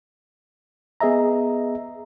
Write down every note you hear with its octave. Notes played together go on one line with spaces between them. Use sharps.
B3 G#4 D#5 E5 A#5